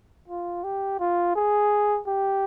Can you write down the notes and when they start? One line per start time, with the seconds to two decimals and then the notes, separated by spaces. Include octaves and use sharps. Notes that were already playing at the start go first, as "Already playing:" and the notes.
0.28 F4
0.64 G4
1.00 F4
1.35 G#4
2.07 G4